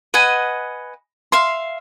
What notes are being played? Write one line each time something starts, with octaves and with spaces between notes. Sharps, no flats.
B4 D#5 F#5 G#5
E5 F5 C6